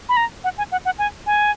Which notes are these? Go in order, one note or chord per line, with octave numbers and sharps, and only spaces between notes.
B5
A#5
F#5
G#5
F#5
F#5
G#5
G#5